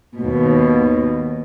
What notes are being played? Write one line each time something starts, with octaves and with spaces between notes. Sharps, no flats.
D#2 B2